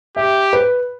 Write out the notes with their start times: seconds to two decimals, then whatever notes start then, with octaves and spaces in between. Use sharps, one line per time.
0.16 G4 E5
0.53 B4